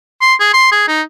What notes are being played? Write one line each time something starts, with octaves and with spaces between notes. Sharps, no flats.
C6
G#4
C6
G#4
D#4